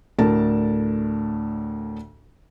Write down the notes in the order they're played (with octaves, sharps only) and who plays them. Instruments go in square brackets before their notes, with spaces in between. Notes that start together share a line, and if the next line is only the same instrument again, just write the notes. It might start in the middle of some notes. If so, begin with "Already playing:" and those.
[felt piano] D2 A2 D4 A#4 A5